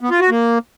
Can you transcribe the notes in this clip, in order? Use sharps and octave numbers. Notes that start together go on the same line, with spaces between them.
B3
F4
F#4
A#3